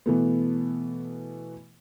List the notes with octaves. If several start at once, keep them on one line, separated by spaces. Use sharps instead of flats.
B2 E3 A3 B3